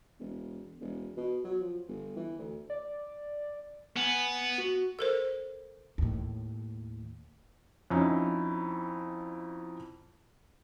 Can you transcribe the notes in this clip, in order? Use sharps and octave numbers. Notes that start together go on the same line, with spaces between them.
E1
E1
B2
F#3
F3
G1
E3
D2
D5
B3 G#5
F#4
A4 A#4 C5
D#2 A2
F2 C#4 D#4 E4